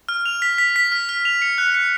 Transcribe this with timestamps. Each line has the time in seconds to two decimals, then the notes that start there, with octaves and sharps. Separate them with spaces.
0.09 F6
0.26 F7
0.42 B6
0.58 B6
0.76 B6
0.92 F6
1.09 F6
1.25 F7
1.42 C#7
1.58 F#6
1.75 C#7